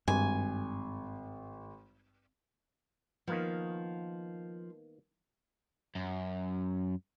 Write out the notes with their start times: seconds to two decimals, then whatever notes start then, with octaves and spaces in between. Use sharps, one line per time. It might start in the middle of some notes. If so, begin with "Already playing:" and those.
0.08 G#1 G2 G#5
3.28 D#3 F3 A#3 B3
5.95 F#2